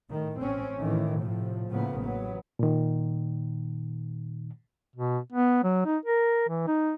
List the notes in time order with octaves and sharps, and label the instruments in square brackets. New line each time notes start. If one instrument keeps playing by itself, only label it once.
[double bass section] A2 D#3
A1 C4 C#4
A2 D#3 E3
A2 C3 F3
A2 C#3 F3 A#3 B3
A1 F#3 B3
[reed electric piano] A#2 D#3
[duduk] B2
B3
F#3
D#4
A#4
E3
D#4